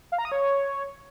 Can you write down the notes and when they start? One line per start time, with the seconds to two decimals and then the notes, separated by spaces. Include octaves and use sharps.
0.12 F5
0.18 A#5
0.25 D#6
0.32 C#5